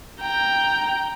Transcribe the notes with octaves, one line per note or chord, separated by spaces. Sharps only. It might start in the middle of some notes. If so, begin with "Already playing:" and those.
G5 A#5